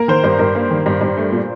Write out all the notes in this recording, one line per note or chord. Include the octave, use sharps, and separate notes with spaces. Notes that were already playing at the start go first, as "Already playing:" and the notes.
Already playing: A#3 A#4
D#3 C5
G2 C5
G2 A#4
A#3
D#3
G2
G2
A3
A#2